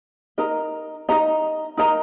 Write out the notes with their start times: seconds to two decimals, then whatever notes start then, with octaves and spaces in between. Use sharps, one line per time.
0.38 D#4 A#4 D#5 A#5
1.09 D#4 A#4 D#5 A#5
1.77 D#4 A#4 D#5 A#5